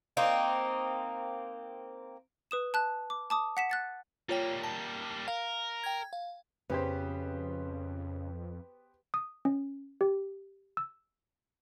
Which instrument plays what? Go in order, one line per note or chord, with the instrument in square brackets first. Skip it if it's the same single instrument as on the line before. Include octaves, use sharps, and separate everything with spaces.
[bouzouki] A#3 C4 D#4
[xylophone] B4 D#6 E7
A5 F#6
D6
A5 D6 D#6
F#5 B6 E7
F#6 A6 C#7
[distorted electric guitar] G3 A#3 [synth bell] F4 C#5 G5
[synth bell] A5
[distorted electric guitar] A#4 [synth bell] F5
[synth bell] G5 G#6
F5
[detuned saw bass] F2 [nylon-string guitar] C#3 [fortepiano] B3 G4 C5
[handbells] D#6
C#4
G4
E6